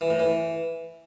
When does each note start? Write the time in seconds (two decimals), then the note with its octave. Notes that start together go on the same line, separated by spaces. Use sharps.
0.01 E3
0.10 A2
0.20 E3